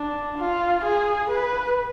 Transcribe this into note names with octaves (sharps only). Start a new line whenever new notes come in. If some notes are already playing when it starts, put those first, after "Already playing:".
Already playing: D4
F4
G#4
B4